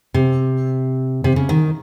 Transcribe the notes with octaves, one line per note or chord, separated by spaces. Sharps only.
C3
C3
C#3
D#3